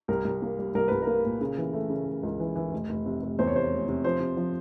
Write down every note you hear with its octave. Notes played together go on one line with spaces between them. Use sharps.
C2 A#4
C2
A#3
G3
C2 A#4
C2 B4
A#3 A#4
A#2
C#3
E3
A3
C#3
A3
C#2
E3
E3
F1
F1
C3
F1
E2 C5
C#5
C3 C5
F1
C3
F3 C5
C3
F3